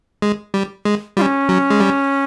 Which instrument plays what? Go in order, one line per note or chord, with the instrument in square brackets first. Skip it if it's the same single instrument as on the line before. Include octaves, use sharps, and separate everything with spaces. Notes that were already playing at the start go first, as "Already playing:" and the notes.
[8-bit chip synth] G#3
G3
G#3
[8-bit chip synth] G3 [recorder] F4
[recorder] C#4
[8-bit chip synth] F#3
G#3
G3